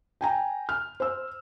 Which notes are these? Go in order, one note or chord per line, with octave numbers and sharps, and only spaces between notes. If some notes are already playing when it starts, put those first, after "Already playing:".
G5 G#5 A#5
F6
C5 E6